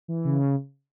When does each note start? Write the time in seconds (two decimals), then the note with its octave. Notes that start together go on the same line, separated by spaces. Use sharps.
0.08 E3
0.25 C#3